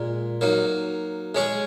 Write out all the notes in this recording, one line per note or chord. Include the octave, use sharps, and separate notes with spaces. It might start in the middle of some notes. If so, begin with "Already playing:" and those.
Already playing: A#2 G#3 A#4
F#3 A#3 D#4
G#3 C#4 G#4